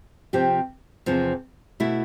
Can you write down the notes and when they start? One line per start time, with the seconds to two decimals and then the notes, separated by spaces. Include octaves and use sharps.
0.33 C3 F3 C4 G4
1.06 E2 C3 F3 C4
1.80 B2 A3 E4